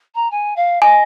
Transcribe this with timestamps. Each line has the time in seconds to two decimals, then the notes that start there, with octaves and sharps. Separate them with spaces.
0.15 A#5
0.31 G#5
0.56 F5
0.82 D#5 G#5